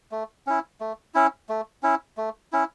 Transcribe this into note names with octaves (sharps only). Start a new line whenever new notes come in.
A3
C#4 E4
A3
C#4 E4
A3
C#4 E4
A3
C#4 E4